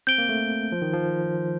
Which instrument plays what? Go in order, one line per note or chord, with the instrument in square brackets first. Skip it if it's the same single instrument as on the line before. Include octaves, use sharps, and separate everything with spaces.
[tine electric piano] C4 [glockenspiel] G6 D7 G7
[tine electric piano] A#3
A3
F3
D#3
F3